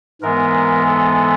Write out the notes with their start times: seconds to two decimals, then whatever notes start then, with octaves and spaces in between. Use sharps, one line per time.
0.21 G#2 E3 G#3 B3 A#4
0.87 A4